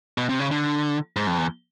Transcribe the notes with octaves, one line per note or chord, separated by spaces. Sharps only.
B2
C3
C#3
D3
G#2
F2
E2